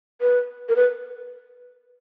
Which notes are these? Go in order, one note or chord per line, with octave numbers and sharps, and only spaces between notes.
B4
A#4
B4